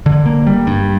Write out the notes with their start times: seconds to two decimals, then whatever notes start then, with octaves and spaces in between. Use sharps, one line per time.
0.06 D3
0.26 A#3
0.47 G3
0.67 G2